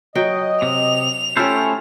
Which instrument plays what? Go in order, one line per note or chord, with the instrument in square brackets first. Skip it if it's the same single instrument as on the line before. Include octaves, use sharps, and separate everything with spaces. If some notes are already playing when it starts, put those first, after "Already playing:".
[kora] F#3 G5 [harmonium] D#5
[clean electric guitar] C3 [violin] F7
[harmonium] A3 C#4 [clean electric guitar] E4 A4 C5 [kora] F4 G4